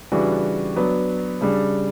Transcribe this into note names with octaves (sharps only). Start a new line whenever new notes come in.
C#3 E3 G3 D4 F#4
F#3 B3 D4
C#3 G3 D4